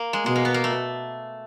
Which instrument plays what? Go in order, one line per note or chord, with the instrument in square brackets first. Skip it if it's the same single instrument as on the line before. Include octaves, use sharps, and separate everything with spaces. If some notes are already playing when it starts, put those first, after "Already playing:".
Already playing: [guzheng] A#3
G#3
[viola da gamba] B2 [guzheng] G#3
[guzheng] A#3
B3
A#3
A3